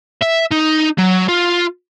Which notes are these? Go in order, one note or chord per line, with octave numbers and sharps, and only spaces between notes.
E5
D#4
F#3
F4